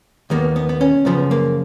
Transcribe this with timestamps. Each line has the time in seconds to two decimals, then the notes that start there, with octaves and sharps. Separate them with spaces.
0.30 D#2 D#3 A#3 B3
0.56 B3
0.69 B3
0.81 C#4
1.05 F#2 C#3 F3 B3
1.31 A#3